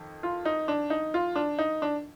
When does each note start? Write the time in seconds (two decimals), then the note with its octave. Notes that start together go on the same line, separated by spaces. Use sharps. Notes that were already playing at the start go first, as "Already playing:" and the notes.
Already playing: F2 D#3
0.23 F4
0.45 D#4
0.68 D4
0.90 D#4
1.14 F4
1.36 D4
1.59 D#4
1.82 D4